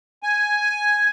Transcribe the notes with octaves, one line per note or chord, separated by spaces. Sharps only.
G#5